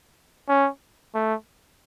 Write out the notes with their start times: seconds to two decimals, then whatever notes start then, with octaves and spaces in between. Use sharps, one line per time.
0.49 C#4
1.15 A3